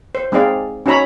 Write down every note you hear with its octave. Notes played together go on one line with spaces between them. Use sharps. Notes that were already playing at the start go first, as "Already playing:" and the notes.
C5
G#3 C4 D#4 G#4 D5 F5
C#4 D#4 F#4 C#5 A#5 B5